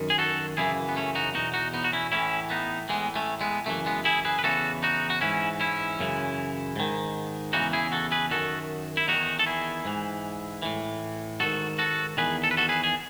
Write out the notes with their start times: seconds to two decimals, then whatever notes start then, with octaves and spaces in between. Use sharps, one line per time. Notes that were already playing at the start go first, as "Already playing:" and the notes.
Already playing: F#2 D#3
0.10 G#4
0.18 F#4 A4
0.57 F#2 C#3 E3 E4 G#4
0.89 B3
0.96 A3 C#4
1.15 D#4 F#4
1.34 E2 B2 D#4 F#4
1.54 D#4 F#4
1.74 B3 D#4
1.84 F#4
1.93 C#4 E4
2.12 A2 E3 C#4 E4
2.50 B3 D#4
2.89 A2 E3 G#3 B3
3.16 A3 C#4
3.41 G#3 B3
3.66 F#2 C#3 E3 A3
3.86 G#3 B3
4.05 E4 G#4
4.25 G#4 B4
4.39 B4
4.44 E2 C#3 E3 F#4 A4
4.83 D#4 F#4
5.10 F#4
5.21 G#2 E3 C#4 E4
5.60 C#4 E4
5.99 F#2 C#3 E3
6.76 G#2 D#3
7.53 E2 C#3 E3 D#4 F#4
7.73 E4 G#4
7.92 F#4 A4
8.11 G#4 B4
8.31 F#2 D#3 F#4 A4
8.97 E4
9.08 E2 D#3 D#4 F#4
9.39 A4
9.46 E4 G#4
9.85 G#2 E3
10.62 A2 E3
11.40 G#2 D#3 F#4 A4
11.79 F#4 A4
12.17 E2 D#3 G#4 B4
12.44 A4
12.51 B4
12.57 F#4 A4
12.69 G#4 B4
12.84 G#4